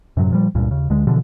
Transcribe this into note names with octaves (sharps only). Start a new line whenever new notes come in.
F#2 A2 C3 F#3
A#2 F3 G3
C#2 G2 A#2
D#2 C#3
D2 D3 G#3
B2 D3 E3 F3